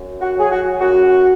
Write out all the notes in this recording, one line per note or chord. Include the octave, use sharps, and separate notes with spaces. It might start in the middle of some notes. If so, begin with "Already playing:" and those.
Already playing: F#2
F#4
F#3 G#4
F#4
F#2 F#4